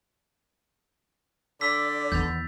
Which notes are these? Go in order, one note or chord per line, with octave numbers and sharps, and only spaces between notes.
D3 D5 E6 B6
E2 D#3 B3 G6 A6 F7